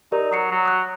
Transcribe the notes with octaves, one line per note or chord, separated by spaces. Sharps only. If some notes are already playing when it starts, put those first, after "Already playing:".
D#4 G4 A#4 D5
F#3 D#6 C7 C#7
F#3
D#6 F#6